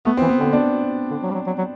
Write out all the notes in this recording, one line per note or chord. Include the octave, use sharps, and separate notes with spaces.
A3 B3
E3 C4
B3
D3 C4
B3 D4
D3
F#3
G3
F#3
F#3
F#3